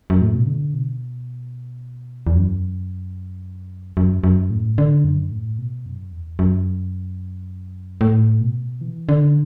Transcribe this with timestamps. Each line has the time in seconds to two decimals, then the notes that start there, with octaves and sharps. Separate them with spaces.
0.10 F#2
0.22 A2
0.34 B2
0.47 D3
0.74 B2
2.27 E2
2.36 F#2
3.97 F#2
4.24 F#2
4.50 A2
4.78 D3
5.04 F#2
5.31 A2
5.58 B2
5.86 F#2
6.12 E2
6.39 F#2
8.01 A2
8.41 B2
8.81 E3
9.09 D3